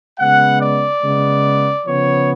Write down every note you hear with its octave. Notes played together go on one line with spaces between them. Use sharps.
C#3 G#3 B3 F#5
D5
C#3 G#3 B3
C#3 F3 B3 C#5